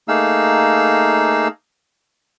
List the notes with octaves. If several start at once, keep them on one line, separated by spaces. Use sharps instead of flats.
A3 A#3 D#4 G#4 F5 E6